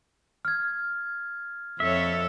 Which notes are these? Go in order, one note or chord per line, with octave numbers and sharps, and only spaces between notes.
F6 G#6
F2 A4 C#5 E5